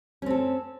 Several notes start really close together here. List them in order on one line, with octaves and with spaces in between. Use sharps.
C#4 C4 A4